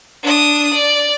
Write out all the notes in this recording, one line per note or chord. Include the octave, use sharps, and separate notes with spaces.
D4 D#6
D5